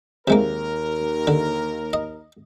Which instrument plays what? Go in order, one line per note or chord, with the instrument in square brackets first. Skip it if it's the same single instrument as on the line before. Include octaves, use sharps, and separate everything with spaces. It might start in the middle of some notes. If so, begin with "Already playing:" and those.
[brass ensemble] D#2 A#4 [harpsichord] C3 G#3 A#3
[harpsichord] D3
D#5